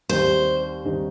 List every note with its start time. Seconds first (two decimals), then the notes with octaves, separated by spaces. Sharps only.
0.09 D#2 D#3 G3 C4 D#4 C5
0.85 D#2 D#3 G3 C4 D#4